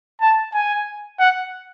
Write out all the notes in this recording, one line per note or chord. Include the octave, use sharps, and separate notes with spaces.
A5
G#5
F#5